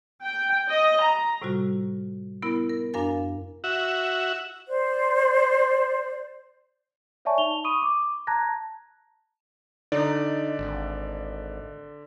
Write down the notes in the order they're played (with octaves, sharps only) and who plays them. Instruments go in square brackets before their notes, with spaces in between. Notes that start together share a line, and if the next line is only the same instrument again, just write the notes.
[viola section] G5
D#5
A#5
[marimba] A2 C3 G3 F4 F#4
B3 E4 A#4
A#4
F#2 D4 A#4 F5 G#5 A6
[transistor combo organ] F#4 E5
[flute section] C5 D5
[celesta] C#5 D5 E5 G#5 A5 C#6
D#4 F7 G7
B5 C#6 D#6 D#7
D6
A5 A#5 F#6 G#6 A#6
[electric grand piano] D3 D5 [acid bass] D#4
[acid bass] G#1